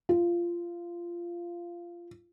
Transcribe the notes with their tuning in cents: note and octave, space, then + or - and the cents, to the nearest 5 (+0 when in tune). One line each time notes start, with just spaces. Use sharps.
F4 -15